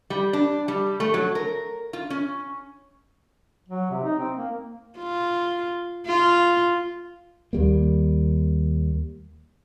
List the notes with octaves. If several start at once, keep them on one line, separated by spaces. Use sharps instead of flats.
G3
D4
G3
A3
F#3
A#4
F4
C#4
F#3
C3
D#4
C4
A#3
F4
F4
D#2 G3 A#3